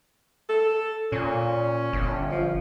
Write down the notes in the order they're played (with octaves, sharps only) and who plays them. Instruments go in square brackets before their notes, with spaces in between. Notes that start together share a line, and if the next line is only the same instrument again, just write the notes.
[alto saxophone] A4
[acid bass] A#2 [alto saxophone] C#4
[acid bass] G1
[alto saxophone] F3